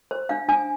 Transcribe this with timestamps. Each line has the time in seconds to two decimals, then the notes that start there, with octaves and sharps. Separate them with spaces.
0.11 C5
0.29 D4 F5
0.49 D4 G#5